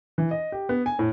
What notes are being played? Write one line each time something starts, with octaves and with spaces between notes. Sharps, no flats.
E3
D#5
G4
B3
G#5
A2